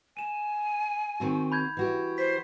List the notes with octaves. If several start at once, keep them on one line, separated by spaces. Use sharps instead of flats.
G#5 D#7 E7
D#3 C4 F#4
B5 G6 G#6
E3 F#4 G4
C5 B6